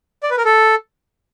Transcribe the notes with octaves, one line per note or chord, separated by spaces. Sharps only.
D5
B4
A#4
A4